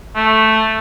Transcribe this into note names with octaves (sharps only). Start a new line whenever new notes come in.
A3